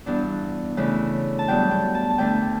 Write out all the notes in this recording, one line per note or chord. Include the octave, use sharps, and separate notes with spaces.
G2 E3 B3 D4
C#3 E3 A3 D4
A5
G2 F#3 B3 D4 G5
G5
A5
A5
D2 D3 A3 D4 G5